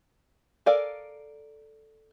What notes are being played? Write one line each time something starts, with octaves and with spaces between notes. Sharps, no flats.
A4 A#4 D5 F5 G#5